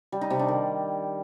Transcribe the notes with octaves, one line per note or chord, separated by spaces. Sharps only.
G3
D#4
C3
D4
D#3